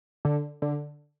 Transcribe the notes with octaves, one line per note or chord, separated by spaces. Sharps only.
D3
D3